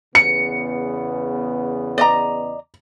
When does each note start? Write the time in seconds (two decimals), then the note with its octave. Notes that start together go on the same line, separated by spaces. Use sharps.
0.15 E2 C#3 B3 C#7
1.98 D5 D#5 A#5